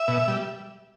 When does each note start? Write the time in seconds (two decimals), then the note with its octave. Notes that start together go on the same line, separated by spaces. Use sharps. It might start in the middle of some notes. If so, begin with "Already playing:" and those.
Already playing: E5
0.08 B2
0.28 G3